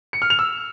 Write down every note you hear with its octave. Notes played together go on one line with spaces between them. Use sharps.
C#7
F6
F7
E6